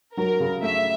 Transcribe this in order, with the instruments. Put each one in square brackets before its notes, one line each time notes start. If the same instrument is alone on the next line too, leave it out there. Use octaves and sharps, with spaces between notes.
[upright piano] F#3 [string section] A#4
[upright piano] C#3
[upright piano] A3 [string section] E5